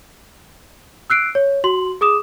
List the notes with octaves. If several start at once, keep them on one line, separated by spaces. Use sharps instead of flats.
E6 F#6 C7 D7
C#5
F#4 C6 F#7
G#4 D6 D#6 E7